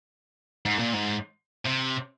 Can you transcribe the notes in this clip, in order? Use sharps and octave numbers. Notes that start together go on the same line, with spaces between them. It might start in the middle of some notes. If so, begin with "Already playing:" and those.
G#2
A#2
G#2
C3